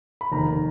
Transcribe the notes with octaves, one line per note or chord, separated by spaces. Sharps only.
B5
F1 D#2 D#3 A#5